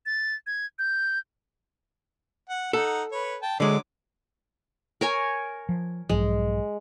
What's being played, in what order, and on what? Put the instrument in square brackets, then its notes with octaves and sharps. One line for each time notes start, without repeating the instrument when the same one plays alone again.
[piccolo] A6
G#6
G6
[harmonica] F#5
[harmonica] D#4 F#5 [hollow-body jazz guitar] A4
[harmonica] B4 C#5
G5 A5
[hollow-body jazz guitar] D3 G#3 [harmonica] F#3 C#5 D6
[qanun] A#4 C#5 G#5
[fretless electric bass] F3
[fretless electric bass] B1 G#2 F3 [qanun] G#3